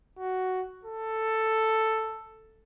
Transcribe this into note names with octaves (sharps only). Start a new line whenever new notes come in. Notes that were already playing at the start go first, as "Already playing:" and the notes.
F#4
A4